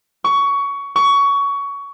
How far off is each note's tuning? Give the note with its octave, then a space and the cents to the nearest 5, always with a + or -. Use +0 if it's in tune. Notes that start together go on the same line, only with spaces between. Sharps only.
C#6 +20
C#6 +20